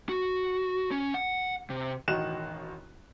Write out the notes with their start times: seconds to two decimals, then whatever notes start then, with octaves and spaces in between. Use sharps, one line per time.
0.09 F#4
0.91 C#4
1.14 F#5
1.70 C3
2.08 E1 A1 D#3 F#4 F#6 E7